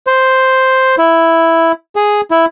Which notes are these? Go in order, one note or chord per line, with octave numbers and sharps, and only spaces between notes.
C5
E4
G#4
E4